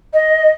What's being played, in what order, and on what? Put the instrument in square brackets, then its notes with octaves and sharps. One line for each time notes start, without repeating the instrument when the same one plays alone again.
[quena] D#5